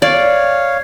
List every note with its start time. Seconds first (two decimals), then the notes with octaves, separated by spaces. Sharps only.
0.02 C#5 D5 F5